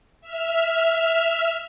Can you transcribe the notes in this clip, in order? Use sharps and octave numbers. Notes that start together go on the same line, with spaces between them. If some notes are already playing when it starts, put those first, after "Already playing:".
E5 F6